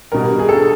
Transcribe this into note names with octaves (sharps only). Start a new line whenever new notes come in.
B2 G3 A#4
G#4
A4